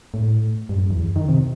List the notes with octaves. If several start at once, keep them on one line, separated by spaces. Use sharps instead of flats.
A2
G2
F#2
E2
F#2
D#3
C3